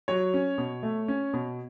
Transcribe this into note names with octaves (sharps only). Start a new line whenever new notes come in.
F#3 C#5
C#4
B2
A3
C#4
B2